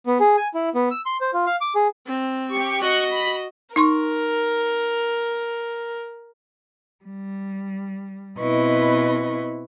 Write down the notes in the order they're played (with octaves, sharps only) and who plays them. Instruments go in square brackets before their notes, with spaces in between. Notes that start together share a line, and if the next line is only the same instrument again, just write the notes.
[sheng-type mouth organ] B3
G#4
G#5
E4
B3
E6
C6
C5
F4
F5
D6
G#4
[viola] C4
[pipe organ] G4 C#6
[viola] F#4 D#5 [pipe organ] C#6 F#6
[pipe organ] B5
[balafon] D#4 C6 C#6 [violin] A#4
[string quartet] G3
B2 C4 E4 B4 D#5 C#6